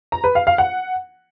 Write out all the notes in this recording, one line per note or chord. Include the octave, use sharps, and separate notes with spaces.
A#5
B4
F5
F5
F#5